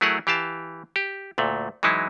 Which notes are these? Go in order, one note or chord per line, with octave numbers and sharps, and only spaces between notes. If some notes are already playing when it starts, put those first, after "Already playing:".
F#3 A3 E4 G#4 A#4 F#5
E3 G4 F5 A5
G4
D2 A#2 A3
E3 F#3 G#3 D#4 E4